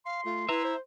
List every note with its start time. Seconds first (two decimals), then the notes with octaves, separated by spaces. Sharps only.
0.06 F5 C6
0.25 A3 F4
0.49 E4 B4 E5 A#5
0.64 C5